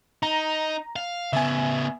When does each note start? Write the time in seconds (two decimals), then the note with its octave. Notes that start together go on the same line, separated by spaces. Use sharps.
0.23 D#4 A#5
0.96 F5
1.33 C#3 B3 E5 G#5